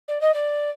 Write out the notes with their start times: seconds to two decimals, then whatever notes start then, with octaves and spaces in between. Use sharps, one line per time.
0.08 D5
0.21 D#5
0.34 D5